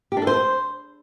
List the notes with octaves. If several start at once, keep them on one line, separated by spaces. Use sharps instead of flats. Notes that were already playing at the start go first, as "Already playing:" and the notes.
G4
D4
A4
C5